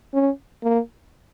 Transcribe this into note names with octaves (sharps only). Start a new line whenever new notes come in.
C#4
A#3